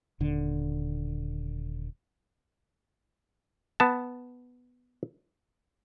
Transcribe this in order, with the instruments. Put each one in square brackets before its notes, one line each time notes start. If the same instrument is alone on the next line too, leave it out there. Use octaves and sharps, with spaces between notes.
[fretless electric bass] D#1 D3
[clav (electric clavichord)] B3 A5